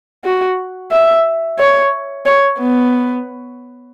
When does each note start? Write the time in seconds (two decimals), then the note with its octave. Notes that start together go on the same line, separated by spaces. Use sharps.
0.24 F#4
0.92 E5
1.58 C#5
2.26 C#5
2.59 B3